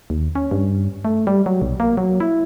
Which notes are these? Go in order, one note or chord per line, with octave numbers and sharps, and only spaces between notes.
D#2
C#4
G2
A3
G3
F#3
B1
A#3
F#3
E4